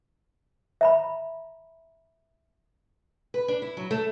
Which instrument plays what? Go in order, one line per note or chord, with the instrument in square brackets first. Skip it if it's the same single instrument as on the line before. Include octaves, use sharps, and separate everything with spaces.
[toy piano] E5 A#5 B5
[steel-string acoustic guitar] B4
D4
E4
F#3
A3